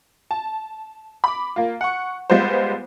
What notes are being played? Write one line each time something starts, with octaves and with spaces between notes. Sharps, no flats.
A5
B5 D6
A#3 F4
F#5 C#6
G3 G#3 B3 F4 C5